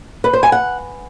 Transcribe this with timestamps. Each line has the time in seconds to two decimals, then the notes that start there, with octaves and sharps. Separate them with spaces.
0.24 B4
0.33 C5
0.43 G#5
0.52 F#5